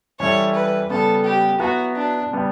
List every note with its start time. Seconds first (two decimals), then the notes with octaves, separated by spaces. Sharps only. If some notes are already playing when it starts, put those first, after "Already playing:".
0.20 E3 G3 C#4 E4 A4 C#5
0.55 B4
0.90 C#3 G3 B3 A4
1.25 G4
1.60 F#3 B3 E4 F#4 B4
1.96 D4
2.31 C#3 G3 B3